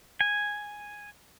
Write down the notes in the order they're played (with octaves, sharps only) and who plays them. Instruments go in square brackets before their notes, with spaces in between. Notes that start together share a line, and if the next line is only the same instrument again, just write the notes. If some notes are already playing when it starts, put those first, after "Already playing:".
[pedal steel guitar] G#5